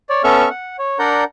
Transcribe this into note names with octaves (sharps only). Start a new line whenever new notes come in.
C#5 D5
B3 C#4 A4 E5 C#6 F6
F#5
C#5
D4 A#4 D5 F#5 A#5 G6